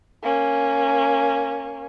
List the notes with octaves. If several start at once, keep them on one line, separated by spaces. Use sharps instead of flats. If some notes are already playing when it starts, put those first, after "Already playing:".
A#3 C#4